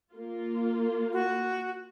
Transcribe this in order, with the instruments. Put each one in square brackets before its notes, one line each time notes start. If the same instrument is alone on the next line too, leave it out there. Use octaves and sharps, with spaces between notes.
[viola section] A#3 F4
[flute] F#4